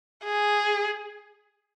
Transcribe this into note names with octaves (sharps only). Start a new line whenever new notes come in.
G#4